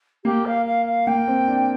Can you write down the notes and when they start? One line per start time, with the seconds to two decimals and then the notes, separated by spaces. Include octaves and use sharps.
0.24 A#3 G4
0.46 F5
0.66 F5
0.86 F5
1.07 A#3 G5
1.27 C4
1.48 D4